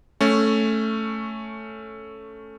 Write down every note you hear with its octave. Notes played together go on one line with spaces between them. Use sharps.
A3 C#4